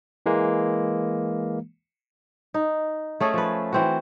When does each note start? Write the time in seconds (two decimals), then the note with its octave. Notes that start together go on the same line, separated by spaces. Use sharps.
0.26 E3 G#3 A#3
2.54 D#4
3.20 A3 C#4 G#4 A4
3.34 F3 B4
3.73 E3 C4 F#4